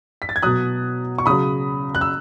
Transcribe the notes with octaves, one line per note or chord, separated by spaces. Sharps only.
B6
A6
G#6
B2 F#3 D#6 F#6
C#6
C#3 F#3 B5 D#6
F#6
E6